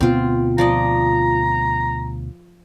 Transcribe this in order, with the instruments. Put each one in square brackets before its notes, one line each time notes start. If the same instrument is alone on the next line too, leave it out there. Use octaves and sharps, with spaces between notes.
[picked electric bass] D2 B2 B3 [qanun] C4 F4
[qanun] F3 D5 D#5 [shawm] A#5